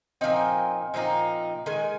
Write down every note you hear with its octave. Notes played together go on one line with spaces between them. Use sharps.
A#2 F3 C4 D#4 G#5
A#2 F3 C4 D#4
D#3 G#3 G#5